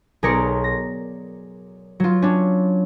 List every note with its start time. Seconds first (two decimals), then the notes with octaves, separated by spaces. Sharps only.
0.23 B1 G#4 A#4 D5 C#7
0.64 A#6
2.00 F#3 F4
2.22 C#4 D4